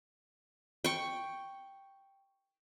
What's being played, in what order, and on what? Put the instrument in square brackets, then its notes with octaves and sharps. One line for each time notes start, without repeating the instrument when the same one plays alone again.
[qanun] G5 C#6